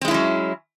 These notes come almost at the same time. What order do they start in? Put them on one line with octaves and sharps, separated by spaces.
C4 G#3 E4 C#4 F#3